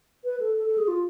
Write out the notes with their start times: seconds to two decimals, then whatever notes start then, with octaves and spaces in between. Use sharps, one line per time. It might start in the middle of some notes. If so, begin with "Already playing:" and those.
0.24 B4
0.40 A4
0.56 A4
0.67 A4
0.78 G#4
0.88 F4